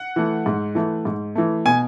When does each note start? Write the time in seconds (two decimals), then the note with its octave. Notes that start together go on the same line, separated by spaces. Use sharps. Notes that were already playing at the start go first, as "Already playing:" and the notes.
Already playing: F#5
0.16 E3 A3
0.46 G#2
0.75 E3 A3
1.05 G#2
1.35 E3 A3
1.65 B2 G#5